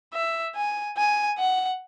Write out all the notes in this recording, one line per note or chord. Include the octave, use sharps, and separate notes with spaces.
E5
G#5
G#5
F#5